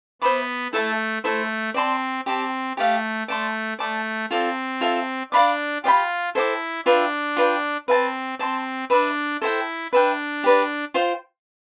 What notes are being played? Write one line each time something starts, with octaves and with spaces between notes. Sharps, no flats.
B3 C5 E5 B5 D6
A3 E4 A4 E5 A5
A3 E4 A4 C5
C4 D5 A5 C6
C4 G4 D5 A5
A3 G4 D5 F5
A3 D5 A5 C6
A3 D5 A5 D6
C4 F4 A4 D5
F4 A4 E5
D4 D5 F5 B5 D6
F4 G4 D5 G5 B5
E4 A4 C5 G5 D6
D4 F4 B4 E5 G5
F4 B4 D5 G5
C4 B4 F5 A5
C4 D5 A5 C6
D4 B4 E5 B5
E4 A4 C5 G5
D4 B4 E5 G5
G4 B4 D5
F4 C5 G5